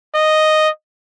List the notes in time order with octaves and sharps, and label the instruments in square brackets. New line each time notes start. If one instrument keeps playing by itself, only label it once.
[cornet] D#5